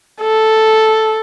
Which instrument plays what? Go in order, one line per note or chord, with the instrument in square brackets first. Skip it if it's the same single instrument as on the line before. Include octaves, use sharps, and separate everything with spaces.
[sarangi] A4